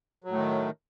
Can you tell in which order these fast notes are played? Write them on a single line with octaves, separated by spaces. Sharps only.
F#3 A2 A3 D#3